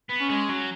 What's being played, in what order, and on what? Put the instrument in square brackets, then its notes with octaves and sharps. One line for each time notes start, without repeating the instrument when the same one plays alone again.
[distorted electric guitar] B3
[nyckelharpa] C#4
[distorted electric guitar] G#3
F#3